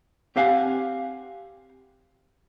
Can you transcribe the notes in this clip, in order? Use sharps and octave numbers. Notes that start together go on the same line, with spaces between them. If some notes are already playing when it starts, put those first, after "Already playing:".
C4 G4 F5 F#5 G#5